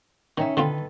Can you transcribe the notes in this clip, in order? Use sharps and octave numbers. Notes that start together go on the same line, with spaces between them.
D#3 C#4 D#4 E5
D3 D#3 C4 F4 A4 B4